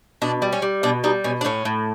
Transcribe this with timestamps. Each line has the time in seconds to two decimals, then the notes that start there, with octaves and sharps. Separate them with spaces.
0.22 B2 D4
0.42 G3
0.52 C#4
0.62 G3
0.83 B2 D4
1.04 G3 D#4
1.24 B2 C#4
1.41 D4
1.45 A2 C#4
1.65 A2